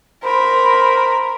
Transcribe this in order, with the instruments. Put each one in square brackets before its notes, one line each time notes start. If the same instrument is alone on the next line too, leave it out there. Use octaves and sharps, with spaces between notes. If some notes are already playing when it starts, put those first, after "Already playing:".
[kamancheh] A#4 B5 [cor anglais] C5